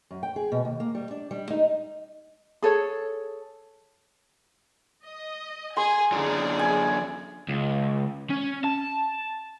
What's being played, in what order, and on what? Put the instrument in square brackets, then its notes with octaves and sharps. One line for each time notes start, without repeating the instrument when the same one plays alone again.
[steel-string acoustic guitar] F#2
G5
G#4
B2
D#2
A#3
G3
D4
G3
D#4
[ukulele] G#4 A4 C#5
[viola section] D#5
[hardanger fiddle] G#4 [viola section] G#5 [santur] C6
[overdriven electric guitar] F#2 D3 [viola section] G#4 [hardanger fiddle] D5
[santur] G#5
[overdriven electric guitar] C#2
C#4
A5